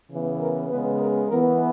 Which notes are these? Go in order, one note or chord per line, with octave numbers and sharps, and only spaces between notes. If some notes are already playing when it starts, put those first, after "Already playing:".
C#3 E3 B3
A#4
C#3 G#3 B3 B4
A#4
E3 B3 A#4